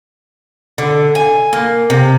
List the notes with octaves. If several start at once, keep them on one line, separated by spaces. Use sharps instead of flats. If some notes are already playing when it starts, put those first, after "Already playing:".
D3
G#5
A#3
C3